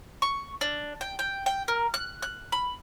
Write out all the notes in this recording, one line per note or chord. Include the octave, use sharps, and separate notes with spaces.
C#6
D4
G5
G5
G5
A#4
F#6
F#6
B5